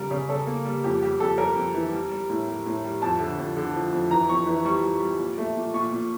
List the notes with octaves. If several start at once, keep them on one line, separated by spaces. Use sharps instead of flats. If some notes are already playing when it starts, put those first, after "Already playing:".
Already playing: C#3 G3 A#4
C#3
C#3 A4
A#3
G3
F2 G4
G3 G4
F2 A4
G3 A#4
F2
E3
G3
G3
A2
G3
A2
G3
F2 A5
D3
F2
D3
F3
F2
E3 A#5
F2 C#6
E3
G3 C#6
G3
G3
A#2
A3
A#2
A#2 C#6
A#2